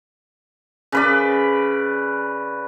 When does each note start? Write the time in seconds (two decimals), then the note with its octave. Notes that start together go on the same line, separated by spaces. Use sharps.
0.92 C#3 B4 D5